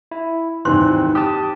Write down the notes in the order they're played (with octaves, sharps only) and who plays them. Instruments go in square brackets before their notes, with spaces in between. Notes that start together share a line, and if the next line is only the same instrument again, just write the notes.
[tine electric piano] E4
[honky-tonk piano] G#1 D#2 F#6 [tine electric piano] E3 C4 [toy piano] C6
[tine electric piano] G4 A5 [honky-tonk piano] D#6